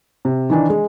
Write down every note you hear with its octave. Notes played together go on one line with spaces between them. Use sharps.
C3
D#3 E3 D4
G#3